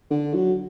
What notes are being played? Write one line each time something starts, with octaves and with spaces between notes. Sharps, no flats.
D3
F#3